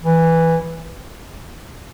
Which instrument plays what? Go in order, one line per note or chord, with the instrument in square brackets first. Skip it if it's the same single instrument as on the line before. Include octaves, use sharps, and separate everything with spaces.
[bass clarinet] E3